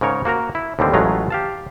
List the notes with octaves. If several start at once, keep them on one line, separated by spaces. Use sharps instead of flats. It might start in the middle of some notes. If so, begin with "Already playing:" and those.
G#2 C#3 A#4 C#5
A#3 F#4 A#4 A#5
E4
D#2 A2 D3 G3 C4
A1 F#3 G#3 A3 F4 A#5
G4 F5 A5